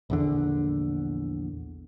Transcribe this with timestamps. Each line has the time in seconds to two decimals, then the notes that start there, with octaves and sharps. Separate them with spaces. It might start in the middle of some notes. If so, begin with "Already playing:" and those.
0.10 A#1 E2 D3